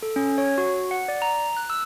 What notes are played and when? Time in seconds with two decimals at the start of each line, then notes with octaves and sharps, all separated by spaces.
0.03 A4
0.16 C#4
0.38 C#5
0.58 F#4
0.91 F#5
1.08 D5
1.22 A#5
1.57 F#6
1.70 E6